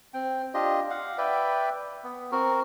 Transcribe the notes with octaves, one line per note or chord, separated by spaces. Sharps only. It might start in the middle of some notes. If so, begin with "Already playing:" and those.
C4 G5
D4 F4 G4 D#5
F5 F#5
B4 D5 E5 G5
B3
C4 F#4 A#4